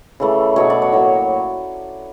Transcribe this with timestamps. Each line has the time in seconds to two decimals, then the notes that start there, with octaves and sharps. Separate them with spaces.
0.20 C#3 E3 A3
0.56 B2 F#3 B3 C#5
0.70 D5
0.82 C#5
0.92 A2 F#3 A#3